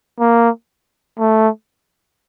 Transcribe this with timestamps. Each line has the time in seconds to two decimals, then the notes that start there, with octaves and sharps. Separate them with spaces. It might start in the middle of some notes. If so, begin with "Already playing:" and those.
0.19 A#3
1.19 A3